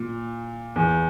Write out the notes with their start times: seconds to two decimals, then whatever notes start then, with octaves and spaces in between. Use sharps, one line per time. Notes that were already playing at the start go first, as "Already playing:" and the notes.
Already playing: A#2
0.76 E2